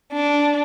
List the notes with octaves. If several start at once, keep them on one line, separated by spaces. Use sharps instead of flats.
D4